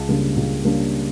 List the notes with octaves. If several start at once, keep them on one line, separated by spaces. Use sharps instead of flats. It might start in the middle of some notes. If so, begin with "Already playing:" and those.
Already playing: C#2 A5
C#3 G3 A#3 D4
C#2
C#3 G3 A#3 D4